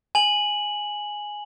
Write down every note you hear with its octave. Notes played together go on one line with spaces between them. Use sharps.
G#5 F#7